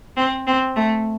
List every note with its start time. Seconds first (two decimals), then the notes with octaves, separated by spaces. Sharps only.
0.17 C4
0.47 C4
0.76 A3